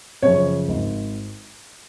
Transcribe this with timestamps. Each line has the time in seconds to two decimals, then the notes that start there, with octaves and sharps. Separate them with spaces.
0.22 F#2 C#3 F3 C#5
0.68 G#1